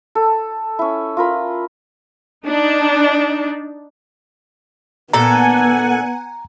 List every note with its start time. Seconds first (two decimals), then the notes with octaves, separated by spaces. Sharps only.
0.15 A4
0.79 C#4 E4
1.17 F4 A#4 B5
2.47 D4 D#4
5.13 A#2 B3 A4 F#5 G#5 A#5